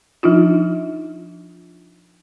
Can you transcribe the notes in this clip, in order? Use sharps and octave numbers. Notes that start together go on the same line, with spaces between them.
F3 D4 D#4 F4